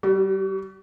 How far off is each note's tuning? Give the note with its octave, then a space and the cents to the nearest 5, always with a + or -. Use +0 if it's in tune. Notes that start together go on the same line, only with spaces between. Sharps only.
G3 -25 F#4 +35